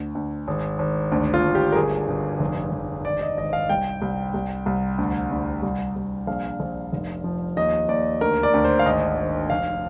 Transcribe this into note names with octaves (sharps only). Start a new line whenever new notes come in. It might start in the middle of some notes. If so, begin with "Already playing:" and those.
Already playing: D2
D2
G#1
G#1
D2
F4
D2
G4
A#4
G1 G#4
G1
F1
F1
G#1 D5
D#5
G#1 D#5
F5
C2 G5
C2
C2
C2
D2
D2
C2
C2
A#1 F5
A#1
F1
F3
D#2 D#5
D#2 D5
D2 A#4
D5
D2
C5
F5
G#1 D#5
G#1
F1 F5